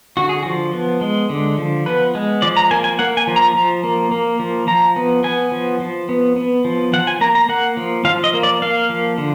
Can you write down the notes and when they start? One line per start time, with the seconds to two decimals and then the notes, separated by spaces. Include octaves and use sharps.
0.17 D3 F#4
0.29 G#4
0.43 F3 F#4
0.73 B3
1.01 G#3
1.30 D3
1.58 F3
1.86 B3 B4
2.15 G#3
2.42 F3 D5
2.57 A#5
2.71 A#3 G#5
2.84 G#5
2.99 A#3 F#5
3.17 G#5
3.27 F3
3.36 A#5
3.55 F3
3.84 A#3
4.11 A#3
4.39 F3
4.67 F3 A#5
4.96 B3
5.24 B3 G#5
5.52 F3
5.80 F3
6.09 B3
6.36 B3
6.65 F3
6.93 F3 F#5
7.07 G#5
7.21 A#3 A#5
7.35 A#5
7.49 A#3 F#5
7.77 F3
8.05 F3 F5
8.24 D#5
8.34 A#3
8.43 D5
8.62 A#3 F5
8.89 F3
9.18 D3